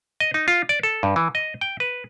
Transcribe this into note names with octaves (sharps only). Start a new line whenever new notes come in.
D#5
D#4
F4
D5
A4
G2
E3
D#5
G5
B4